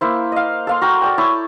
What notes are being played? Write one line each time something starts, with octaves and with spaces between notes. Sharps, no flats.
A#3 E4 C5
D#5 F5
A4 F5 C6
F#4 A#4 G5
A4 D5 G5
E4 C#5 A5 D6